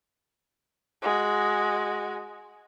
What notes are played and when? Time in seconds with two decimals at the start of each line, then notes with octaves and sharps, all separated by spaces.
1.02 G#3 F#4